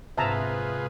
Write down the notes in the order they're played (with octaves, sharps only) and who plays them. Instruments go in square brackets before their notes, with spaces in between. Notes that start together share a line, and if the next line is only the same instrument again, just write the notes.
[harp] G#2 C3 [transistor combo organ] F4 G#4 B4 [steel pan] E5 A5 A#5